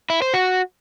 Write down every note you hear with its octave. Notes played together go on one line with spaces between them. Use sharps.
E4
C5
F#4